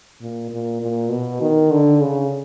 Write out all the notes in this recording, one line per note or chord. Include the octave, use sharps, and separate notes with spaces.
A#2
A#2
A#2
B2
D#3
D3
C#3